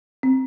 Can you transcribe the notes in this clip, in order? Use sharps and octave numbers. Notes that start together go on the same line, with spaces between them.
C4